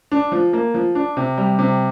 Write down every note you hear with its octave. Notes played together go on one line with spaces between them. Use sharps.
D4
F3
A#3
F3
D4
C3
G3
C3